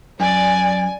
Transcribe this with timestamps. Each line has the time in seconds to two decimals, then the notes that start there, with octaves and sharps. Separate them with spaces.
0.20 F#2 D5 G#5